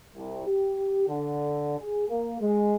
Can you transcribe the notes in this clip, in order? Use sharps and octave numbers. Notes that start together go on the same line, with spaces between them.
C2
G4
D3
G#4
A#3
G#3